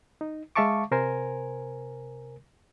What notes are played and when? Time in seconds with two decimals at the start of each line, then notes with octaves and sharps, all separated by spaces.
0.21 D#4
0.56 G#3 E5 F5 A5 C#6 D6
0.91 C3 A#4 C5 G#5